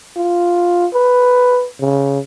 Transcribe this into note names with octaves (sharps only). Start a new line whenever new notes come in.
F4
B4
C#3